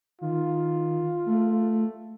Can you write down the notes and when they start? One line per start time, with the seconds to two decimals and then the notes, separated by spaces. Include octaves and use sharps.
0.21 D#3 F4
1.26 A3